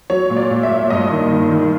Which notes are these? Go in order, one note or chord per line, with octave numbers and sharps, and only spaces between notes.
F#3 C#5
A#2
D5
A#2
E5
A#2
G2 D#5
D#3
D#3
D#3